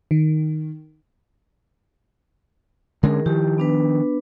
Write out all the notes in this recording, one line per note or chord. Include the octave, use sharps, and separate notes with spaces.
D#3
D3 G#3 C#4 G#4 A#4
D#3 F3 E4 G4
B3 D4 B4